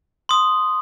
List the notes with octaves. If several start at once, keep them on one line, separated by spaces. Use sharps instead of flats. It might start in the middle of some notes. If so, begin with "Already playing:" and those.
C6 D#6